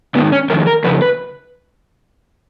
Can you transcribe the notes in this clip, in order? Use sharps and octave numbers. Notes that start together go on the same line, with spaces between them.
G#2 D#3 B3
C#4
F2 D#3 A#4
A#4
F2 C#3 B4
B4